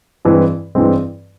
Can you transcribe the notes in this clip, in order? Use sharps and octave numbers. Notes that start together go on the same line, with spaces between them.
G2 E3 G#3 C4
G2 E3 G#3 C4